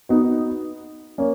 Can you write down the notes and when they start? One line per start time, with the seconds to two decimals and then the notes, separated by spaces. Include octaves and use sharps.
0.09 B3 D#4 F#4
1.18 A#3 C#4